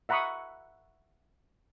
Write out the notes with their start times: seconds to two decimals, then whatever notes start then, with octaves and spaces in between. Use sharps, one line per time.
0.09 E5 F#5 A#5 B5 C#6 D#6